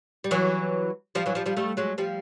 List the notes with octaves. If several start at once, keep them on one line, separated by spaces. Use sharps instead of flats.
G3
E3 F#3
F3 G3
E3 F#3
F3 G3
F3 G3
G3 A3
F#3 G#3
F3 G3